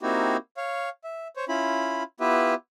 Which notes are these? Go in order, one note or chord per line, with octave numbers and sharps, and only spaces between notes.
A#3 C4 D#4 E4 F#4 G4
C#5 F5
E5
C5 C#5
C#4 E4 F4 B5
B3 E4 F4 G4 B4 E5